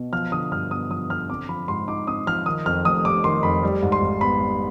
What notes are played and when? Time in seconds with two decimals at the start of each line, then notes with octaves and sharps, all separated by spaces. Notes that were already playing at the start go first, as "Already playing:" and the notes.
Already playing: B2
0.13 F3 F6
0.32 D3 D#6
0.52 G2 F6
0.71 B3 D#6
0.91 F3 D#6
1.10 D3 F6
1.30 C4 D6
1.49 F3 B5
1.68 G#2 C6
1.88 D#4 D6
2.07 C4 D#6
2.27 F3 F6
2.46 D#3 D#6
2.66 F2 F6
2.85 F1 D#6
3.05 G3 D6
3.24 D#3 C6
3.43 F2 B5
3.63 G3
3.83 G#2
3.92 C6
4.02 G#1
4.21 B3 B5
4.41 G3